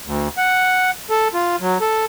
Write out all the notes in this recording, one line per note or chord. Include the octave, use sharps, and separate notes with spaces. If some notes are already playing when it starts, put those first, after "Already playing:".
D2
F#5
A4
F4
F#3
A4